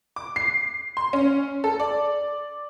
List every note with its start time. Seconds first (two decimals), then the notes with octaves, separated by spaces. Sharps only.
0.16 D6
0.36 C7
0.97 C6
1.13 C#4
1.64 A4
1.80 D5